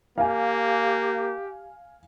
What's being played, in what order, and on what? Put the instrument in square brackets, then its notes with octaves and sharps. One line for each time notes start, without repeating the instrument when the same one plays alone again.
[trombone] A#3 [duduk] G4 [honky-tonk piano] F5 G#5